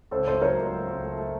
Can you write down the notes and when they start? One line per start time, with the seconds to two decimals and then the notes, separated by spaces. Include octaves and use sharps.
0.11 C#2 A4 C5
0.26 A3 A4 C5
0.42 F#3 A#4 C#5
0.57 C#2
0.73 F#3
0.87 C#2
1.03 A3
1.18 A3